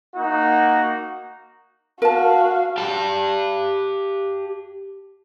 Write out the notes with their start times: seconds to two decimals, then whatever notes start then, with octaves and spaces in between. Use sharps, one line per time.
0.16 A#3 D#4 F#4
2.02 F#4 A#4 F5 A5
2.78 G4 A5